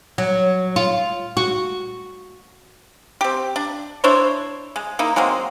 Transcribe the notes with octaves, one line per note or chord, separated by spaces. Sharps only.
F#3
F4
F#4
C4 G4
D4
D4 E4 C5 C#5
G#3
A#3 D#4 E4
F#3 G#3 A#3 C4